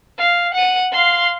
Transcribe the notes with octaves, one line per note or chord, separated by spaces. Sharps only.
F5
F#5 D#7
F5 C6